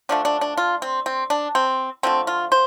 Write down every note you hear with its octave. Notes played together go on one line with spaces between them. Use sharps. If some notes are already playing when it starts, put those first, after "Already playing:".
D3 F3 A3 D4
D4
D4
F4
C4
C4
D4
C4
D3 F3 A3 C4
F4
C5